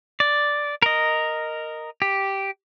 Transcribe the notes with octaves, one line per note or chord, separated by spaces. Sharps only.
D5
A#4 D#5
G4